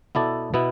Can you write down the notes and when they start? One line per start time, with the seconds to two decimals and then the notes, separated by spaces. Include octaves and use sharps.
0.15 B2 B3 E4 A4 D5
0.54 B2 B3 E4